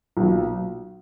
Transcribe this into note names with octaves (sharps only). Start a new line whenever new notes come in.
B1 A#2 F#3